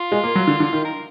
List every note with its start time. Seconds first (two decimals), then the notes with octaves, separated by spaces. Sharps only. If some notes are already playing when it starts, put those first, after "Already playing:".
Already playing: F4
0.12 G#3
0.24 A#3
0.35 F#3
0.47 D3
0.60 D3
0.73 D#3
0.84 A#4